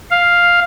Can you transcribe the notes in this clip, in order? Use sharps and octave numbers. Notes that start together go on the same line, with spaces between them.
F5